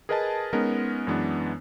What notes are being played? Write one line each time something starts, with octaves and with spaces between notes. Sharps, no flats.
G#4 A#4 B4 D#5 G#5 A5
G#3 B3 C#4 D#4 A#4
F#2 E3 G#3 B3 D4